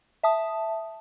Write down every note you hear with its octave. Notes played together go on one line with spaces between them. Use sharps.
E5 A5 D#6